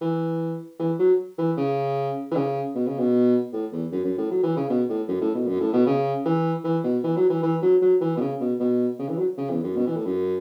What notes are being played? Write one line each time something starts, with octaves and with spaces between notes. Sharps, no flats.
E3
E3
F#3
E3
C#3
E3
C#3
B2
C#3
B2
A2
E2
F#2
F#2
A2
F#3
E3
C#3
B2
A2
F#2
A2
B2
F#2
A2
B2
C#3
E3
E3
B2
E3
F#3
E3
E3
F#3
F#3
E3
B2
C#3
B2
B2
C#3
E3
F#3
C#3
E2
F#2
B2
E3
A2
F#2